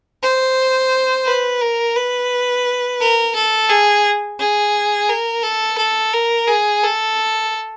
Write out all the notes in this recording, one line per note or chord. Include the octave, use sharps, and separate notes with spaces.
C5
B4
A#4
B4
A#4
A4
G#4
G#4
A#4
A4
A4
A#4
G#4
A4